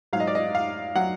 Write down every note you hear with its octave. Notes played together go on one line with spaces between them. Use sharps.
G#2 F#3 F5
D#5
D5
D#5
F5
F#3 F#5